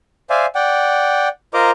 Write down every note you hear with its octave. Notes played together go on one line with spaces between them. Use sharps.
C5 D5 E5 F5 G#5
D5 F#5 G5
F4 A#4 C5 D#5 A#5 D6